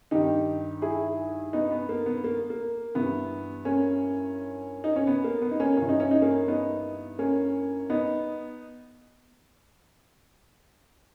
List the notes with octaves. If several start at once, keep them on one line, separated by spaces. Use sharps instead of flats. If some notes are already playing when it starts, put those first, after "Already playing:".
G2 D#3 D#4 G4
E4 G#4
B3 D#4
B3
A#3
B3
A#3
A#3
G2 E3 B3
A#3 C#4
D#4
C#4
B3
A#3
B3
D#4
A#3 C#4
G2 E3 C#4
D#4
C#4
D#4
A#3 C#4
B3 D#4
A#3 C#4
B3 D#4